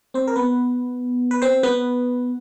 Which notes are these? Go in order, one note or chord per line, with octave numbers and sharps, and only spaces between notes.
C4 C5
A#4
B3 B4
B4
C4 C5
B3 B4